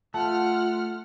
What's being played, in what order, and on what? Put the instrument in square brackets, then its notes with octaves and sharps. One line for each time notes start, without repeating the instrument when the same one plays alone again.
[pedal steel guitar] A3 [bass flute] F4 [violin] F#5 F6 [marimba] A5